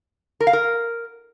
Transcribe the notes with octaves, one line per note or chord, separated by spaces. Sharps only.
A#4
F5
A#4